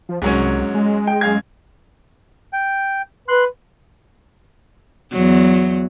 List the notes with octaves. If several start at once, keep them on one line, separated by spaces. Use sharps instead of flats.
F3
C2 G#2 F#3 C#4
G#3
G5
F#2 F5 G#6
G5
B4 C6 F#6
E2 F#3